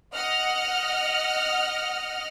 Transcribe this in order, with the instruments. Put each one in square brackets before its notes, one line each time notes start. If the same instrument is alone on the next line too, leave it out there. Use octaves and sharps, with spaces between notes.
[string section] D#5 F#5 F6